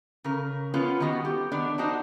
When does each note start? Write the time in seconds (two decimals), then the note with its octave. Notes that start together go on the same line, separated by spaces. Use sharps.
0.24 C#3 A#4
0.74 B3 C#4 F4 B4 F#5
1.00 D#3 G3 B3 F#4
1.25 G4
1.52 D#3 B3 D4 D5
1.78 D4 D#4 F#4 C5